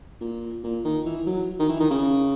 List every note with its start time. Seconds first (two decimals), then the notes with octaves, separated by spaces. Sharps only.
0.21 A#2
0.64 A#2
0.85 D#3
1.06 E3
1.27 F#3
1.59 D#3
1.69 E3
1.80 D#3
1.91 C#3